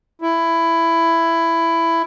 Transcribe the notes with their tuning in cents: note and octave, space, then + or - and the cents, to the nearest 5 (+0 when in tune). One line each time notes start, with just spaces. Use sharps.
E4 +10